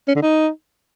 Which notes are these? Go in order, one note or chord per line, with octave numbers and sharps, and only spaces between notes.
C#4
D3
D#4